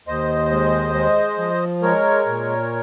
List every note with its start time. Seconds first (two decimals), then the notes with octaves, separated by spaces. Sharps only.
0.07 D#2 C5 D#5
0.51 G#3
0.95 G#3
1.38 F3
1.82 G#3 A#4 C#5
2.26 A#2